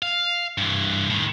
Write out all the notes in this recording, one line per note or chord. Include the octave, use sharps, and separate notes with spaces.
F5
G2 E3
A2 D#3